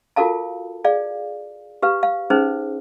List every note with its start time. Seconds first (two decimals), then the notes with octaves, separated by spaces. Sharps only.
0.16 F4 F#4 A4 A#4 F5 A5
0.84 G#4 D5 F5
1.82 G4 B4 F5
2.03 F5
2.30 C#4 D#4 G#4 B4 C5